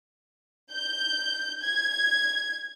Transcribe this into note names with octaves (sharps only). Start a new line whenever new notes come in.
G6
G#6